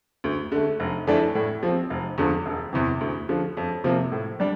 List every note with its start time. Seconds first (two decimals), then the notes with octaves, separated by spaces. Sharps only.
0.24 D2
0.52 D3 A3
0.80 F1
1.07 F2 E3 A3 D4
1.35 A2
1.63 F3 C4
1.90 F1
2.18 E2 D3 F3
2.46 E1
2.73 E2 C3 E3
3.01 D2
3.29 D3 F3
3.57 F2
3.84 C3 F3 A#3
4.12 A2
4.40 G3 D4